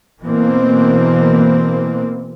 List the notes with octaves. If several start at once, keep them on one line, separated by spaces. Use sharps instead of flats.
B2 E3 A#3 C4